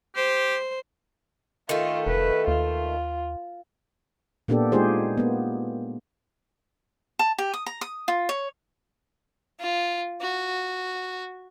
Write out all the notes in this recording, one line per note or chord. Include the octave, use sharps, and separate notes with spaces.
G4 C5
D#3 A3 F4
F1 B4
D#2 F4
A#2 A#3 B3 D4 G4 A4
G#3 D#4 F4 G4 G#4 C5
A#3 B3
A5
G4
D#6
A#5
D#6
F4
C#5
F4
F#4